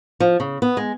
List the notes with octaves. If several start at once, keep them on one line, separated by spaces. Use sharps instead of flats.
F3
C#3
B3
G#3